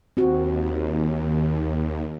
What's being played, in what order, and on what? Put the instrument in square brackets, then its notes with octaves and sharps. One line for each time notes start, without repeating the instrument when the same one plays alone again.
[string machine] D#2 [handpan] C4 F#4